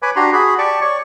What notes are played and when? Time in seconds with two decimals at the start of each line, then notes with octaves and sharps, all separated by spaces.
0.02 B4 C#5 G#5 B5 D6
0.16 D4 F#4 G4 A#5 C6
0.33 F#4 G#4 B5
0.58 G4 D5 A5 C#6 D6
0.81 C#5 D5 C#6